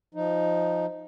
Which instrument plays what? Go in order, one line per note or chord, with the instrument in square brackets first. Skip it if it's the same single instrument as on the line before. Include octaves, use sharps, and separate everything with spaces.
[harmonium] F3 D#4